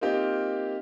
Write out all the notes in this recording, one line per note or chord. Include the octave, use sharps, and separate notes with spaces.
A#3 C4 D#4 F4 G4